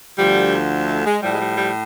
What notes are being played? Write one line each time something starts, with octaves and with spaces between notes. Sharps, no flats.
D2 D3 F3 G3
A3
G#3
A2 F3 G3
G#3
G3
G3